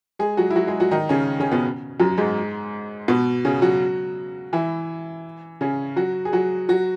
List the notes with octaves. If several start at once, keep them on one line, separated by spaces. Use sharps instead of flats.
G#3 G#4
F#3 F#4
E4
F#3 F#4
G#3 G#4
F#3 F#4
D#3 D#4
C#3 C#4
C#3 C#4
B2 B3
F#2 F#3
G#2 G#3
B2 B3
C#3 C#4
F#3 F#4
E3 E4
C#3 C#4
F#3 F#4
G#4
F#3 F#4
F#3 F#4